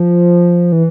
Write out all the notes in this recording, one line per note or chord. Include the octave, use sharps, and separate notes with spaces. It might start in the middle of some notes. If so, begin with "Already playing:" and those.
Already playing: F3
E3